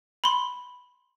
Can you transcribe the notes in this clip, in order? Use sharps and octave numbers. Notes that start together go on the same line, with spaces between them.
B5 C6